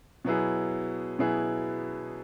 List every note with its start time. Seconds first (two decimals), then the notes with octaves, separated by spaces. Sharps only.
0.25 B2 F#3 B3 E4 G#4
1.19 B2 F#3 B3 E4 G#4